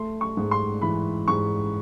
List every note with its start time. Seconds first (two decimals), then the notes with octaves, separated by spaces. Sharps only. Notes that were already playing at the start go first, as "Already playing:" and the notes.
Already playing: A3 C6
0.21 C#6
0.37 G#2
0.51 C6
0.82 E3 B5
1.28 G#2 C#6